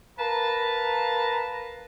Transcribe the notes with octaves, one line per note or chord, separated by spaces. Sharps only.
A#4 B4 F5 A5 A#5